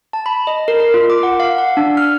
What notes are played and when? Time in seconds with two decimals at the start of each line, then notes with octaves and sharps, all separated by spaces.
0.13 A5
0.26 B5
0.47 D#5
0.68 A#4
0.80 A#4
0.94 F4
1.10 D6
1.23 F#5
1.40 F5
1.58 F#5
1.77 D4
1.97 F6